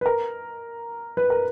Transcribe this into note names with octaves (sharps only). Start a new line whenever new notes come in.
B4
A#4
B4
A#4